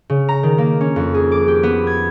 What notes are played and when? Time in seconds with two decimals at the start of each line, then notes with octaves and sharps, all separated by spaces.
0.10 C#3
0.29 A#5
0.43 D#3
0.58 A#3
0.81 C#4
0.96 F2
1.14 G#4
1.32 D6
1.48 G4
1.63 B3
1.87 G#6